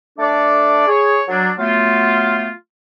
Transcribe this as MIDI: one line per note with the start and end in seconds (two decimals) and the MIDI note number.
0.19 0.87 57
0.19 0.87 62
0.19 0.87 69
0.19 0.87 74
0.88 1.21 68
0.88 1.21 73
1.28 1.51 54
1.28 1.51 62
1.59 2.51 54
1.59 2.51 57
1.59 2.51 59
1.59 2.51 65